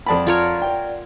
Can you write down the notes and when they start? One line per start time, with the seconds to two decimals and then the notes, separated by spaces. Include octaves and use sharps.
0.07 F2 D5 F#5 A5 B5
0.27 F4 A#4 C#5
0.62 G5